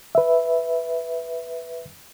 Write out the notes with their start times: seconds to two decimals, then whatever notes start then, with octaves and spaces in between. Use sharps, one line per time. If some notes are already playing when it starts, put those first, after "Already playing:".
0.15 B4 E5